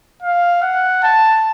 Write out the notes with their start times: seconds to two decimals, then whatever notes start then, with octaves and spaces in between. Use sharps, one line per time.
0.22 F5
0.62 F#5
1.03 A5